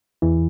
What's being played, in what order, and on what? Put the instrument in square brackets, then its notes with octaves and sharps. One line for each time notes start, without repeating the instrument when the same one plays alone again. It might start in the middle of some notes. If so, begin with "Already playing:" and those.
[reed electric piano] E2 E3